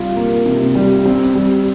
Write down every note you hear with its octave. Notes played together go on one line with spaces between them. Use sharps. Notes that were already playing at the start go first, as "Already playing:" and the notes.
Already playing: C3 G3 F4
A#3
C3
G3
C4
G3